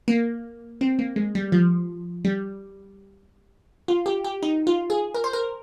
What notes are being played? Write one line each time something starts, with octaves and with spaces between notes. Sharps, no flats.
A#3
C4
A#3
G#3
G3
F3
G3
F4
G4
G4
D#4
F4
G#4
A#4
C5
A#4